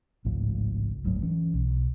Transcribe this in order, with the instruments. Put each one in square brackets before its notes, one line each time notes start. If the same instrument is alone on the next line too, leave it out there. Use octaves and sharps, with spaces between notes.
[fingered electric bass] G#1 C#2 A2 F3
D1 G1 A2 F#3
E3 C#4
B1